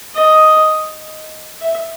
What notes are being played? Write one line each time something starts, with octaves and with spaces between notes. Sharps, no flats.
D#5
E5